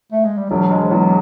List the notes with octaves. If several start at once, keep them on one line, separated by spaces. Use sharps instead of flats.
A3
G#3
G3
E1 F#3
G#3
F3
E2 F#3